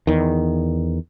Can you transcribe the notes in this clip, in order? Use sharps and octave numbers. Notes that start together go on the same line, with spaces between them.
E2 D#3